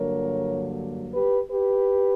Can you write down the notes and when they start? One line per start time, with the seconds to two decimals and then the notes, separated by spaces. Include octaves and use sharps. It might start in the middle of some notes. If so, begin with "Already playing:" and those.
Already playing: G2 D3 F#3 A#3 A#4 C#5
1.13 G4 B4
1.49 G4 B4